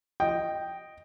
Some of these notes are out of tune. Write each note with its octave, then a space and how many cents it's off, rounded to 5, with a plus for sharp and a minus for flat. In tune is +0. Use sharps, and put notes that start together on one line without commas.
D#5 +0 G5 +0